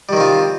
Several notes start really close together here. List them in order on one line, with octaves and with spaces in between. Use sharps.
G3 D#3 C4 F4